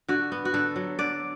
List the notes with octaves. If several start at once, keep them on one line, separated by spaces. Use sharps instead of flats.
D3 F#4
B3
F#4
D3 A4
F#3
D3 D5